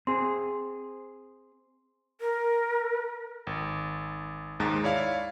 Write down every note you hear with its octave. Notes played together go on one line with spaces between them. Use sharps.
C4 G#4 C6
A#4
G#1
D#2 G#2 G#3 A#5 A6
E4 C#5 D5 F5